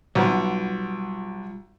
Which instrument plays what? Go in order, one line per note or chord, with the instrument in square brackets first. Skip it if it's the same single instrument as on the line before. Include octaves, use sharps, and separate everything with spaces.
[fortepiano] B1 B3 [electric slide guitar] G3 F4